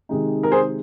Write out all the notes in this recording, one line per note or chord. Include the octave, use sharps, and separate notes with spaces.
C3 D#3 G#3 D#4
A#4
G#4 C5